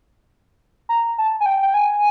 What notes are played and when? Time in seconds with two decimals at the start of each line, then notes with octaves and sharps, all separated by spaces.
0.89 A#5
1.18 A5
1.40 G#5
1.46 G5
1.62 G5
1.74 G#5